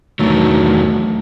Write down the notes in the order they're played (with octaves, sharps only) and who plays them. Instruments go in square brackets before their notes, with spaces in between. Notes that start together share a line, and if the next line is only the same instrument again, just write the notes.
[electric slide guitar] E2 D#3 F#3 [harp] A3 D4